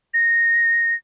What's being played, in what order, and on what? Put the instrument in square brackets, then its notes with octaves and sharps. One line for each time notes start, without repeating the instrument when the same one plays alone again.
[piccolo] A#6